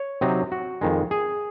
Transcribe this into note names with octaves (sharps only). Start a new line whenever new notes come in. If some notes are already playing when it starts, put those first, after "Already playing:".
Already playing: C#5
C3 F#3 C4 D#4
F#4
F2 D#3 G#3
G#4